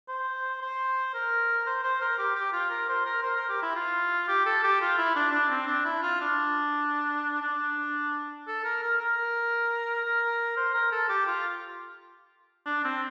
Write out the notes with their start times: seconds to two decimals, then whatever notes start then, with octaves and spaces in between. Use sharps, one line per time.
0.08 C5
0.62 C5
1.14 A#4
1.66 C5
1.83 C5
2.01 A#4
2.18 G4
2.35 G4
2.53 F4
2.70 A#4
2.89 C5
3.05 A#4
3.23 C5
3.36 A#4
3.49 G4
3.62 E4
3.75 F4
4.28 G4
4.46 A4
4.63 G4
4.81 F4
4.98 E4
5.16 D4
5.32 D4
5.50 C4
5.67 D4
5.85 E4
6.02 F4
6.21 D4
7.42 D4
8.47 A4
8.64 A#4
8.83 A#4
9.00 A#4
10.05 A#4
10.57 C5
10.74 A#4
10.92 A4
11.09 G4
11.27 F4
12.66 D4
12.84 C4